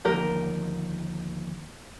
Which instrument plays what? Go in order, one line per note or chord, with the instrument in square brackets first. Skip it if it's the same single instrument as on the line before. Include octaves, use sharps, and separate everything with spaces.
[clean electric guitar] D#2 D3 F3 A#3 D#4 [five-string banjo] G4 A#4